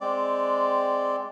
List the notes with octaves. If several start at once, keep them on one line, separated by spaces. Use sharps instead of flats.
G#3 C4 D5